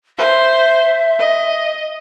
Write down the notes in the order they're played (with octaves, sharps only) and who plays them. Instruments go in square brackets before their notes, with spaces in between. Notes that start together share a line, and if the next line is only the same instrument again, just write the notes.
[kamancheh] C5 [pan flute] E5
[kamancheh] D#5